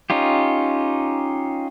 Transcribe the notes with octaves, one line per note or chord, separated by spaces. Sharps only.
C#4 D#4 F4 G4